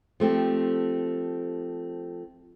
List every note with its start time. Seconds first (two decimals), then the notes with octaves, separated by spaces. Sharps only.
0.20 F3 A3 C4 G4